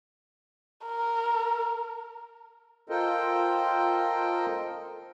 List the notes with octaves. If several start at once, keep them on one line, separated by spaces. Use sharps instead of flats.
A#4
F4 A4 A#4 C5 D#5 G5